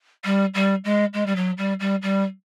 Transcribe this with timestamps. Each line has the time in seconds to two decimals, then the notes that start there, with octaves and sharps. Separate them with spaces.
0.25 G3
0.54 G3
0.84 G#3
1.13 G#3
1.26 G3
1.36 F#3
1.58 G3
1.80 G3
2.02 G3